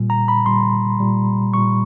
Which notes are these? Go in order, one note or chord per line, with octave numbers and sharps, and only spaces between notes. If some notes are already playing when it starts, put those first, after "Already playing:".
Already playing: A#2 G3
A#5
B5
A#2 G3 C6
A#2 G3
A#2 G3 C#6